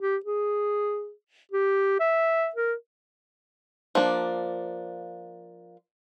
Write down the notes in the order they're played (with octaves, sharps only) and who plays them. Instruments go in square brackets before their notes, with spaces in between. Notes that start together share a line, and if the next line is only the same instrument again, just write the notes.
[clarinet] G4
G#4
G4
E5
A#4
[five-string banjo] F3 A#3 D4